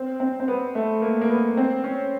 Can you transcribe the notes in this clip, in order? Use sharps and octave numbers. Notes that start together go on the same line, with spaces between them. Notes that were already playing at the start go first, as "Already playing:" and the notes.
Already playing: C4
C4
C4
B3
A3
A#3
A#3
B3
C4
C#4